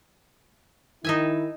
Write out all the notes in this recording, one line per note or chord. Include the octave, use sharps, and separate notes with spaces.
D#3 D#4 E4 E5 G#5